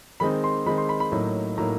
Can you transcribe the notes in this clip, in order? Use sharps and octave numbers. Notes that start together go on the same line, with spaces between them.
D#3 G#3 C4 D#4 B5
C6
D#3 G#3 C4 D#4 B5
C6
B5
B5
A2 F#3 A#3 D#4
A2 F#3 A#3 D#4 A#5